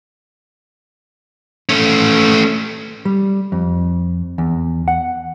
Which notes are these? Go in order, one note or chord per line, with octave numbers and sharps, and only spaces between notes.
A3 C#4
G3
F2
E2
F#5